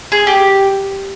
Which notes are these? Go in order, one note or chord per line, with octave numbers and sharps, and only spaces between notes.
G#4
G4